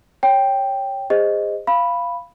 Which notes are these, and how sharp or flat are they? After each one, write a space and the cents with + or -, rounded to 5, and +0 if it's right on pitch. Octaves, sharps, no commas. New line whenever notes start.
C#5 +0 G5 +0
G#4 -35 C5 +0 D#5 +0
F5 -10 B5 +0